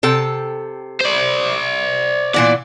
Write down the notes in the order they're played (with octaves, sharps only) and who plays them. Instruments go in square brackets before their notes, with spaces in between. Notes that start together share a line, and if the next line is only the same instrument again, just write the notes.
[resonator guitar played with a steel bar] C3 A4 G5
[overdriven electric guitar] C5 D5
[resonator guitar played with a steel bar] A#2 E3 B3 [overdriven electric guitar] D5